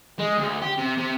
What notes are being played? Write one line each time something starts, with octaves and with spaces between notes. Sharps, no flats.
G#3
D2
G4
C3
C3